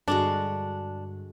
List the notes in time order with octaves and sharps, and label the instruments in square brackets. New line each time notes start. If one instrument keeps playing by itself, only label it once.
[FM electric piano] G2 [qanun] D3 G#3 F#4 [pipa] D4